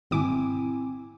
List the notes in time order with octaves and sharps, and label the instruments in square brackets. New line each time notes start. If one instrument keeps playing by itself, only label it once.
[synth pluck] G#1 B2 D6 [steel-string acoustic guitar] C4 E4 G#5